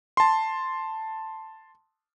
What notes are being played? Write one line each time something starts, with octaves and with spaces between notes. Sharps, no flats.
A5 C6